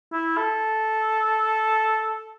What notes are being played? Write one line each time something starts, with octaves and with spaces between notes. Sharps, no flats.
E4
A4